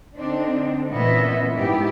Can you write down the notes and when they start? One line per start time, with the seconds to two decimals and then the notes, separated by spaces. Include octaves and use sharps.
0.17 D3 C4 D4 D#4
0.91 A#2 E3 B3 C#4 D#5 E5
1.52 G#2 B3 E4 G4